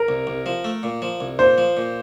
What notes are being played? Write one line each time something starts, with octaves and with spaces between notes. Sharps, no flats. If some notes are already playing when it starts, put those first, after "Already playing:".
Already playing: A#4
C2
C2
F3
A3
A#2
F3
C2
A#2 C5
F3
A#2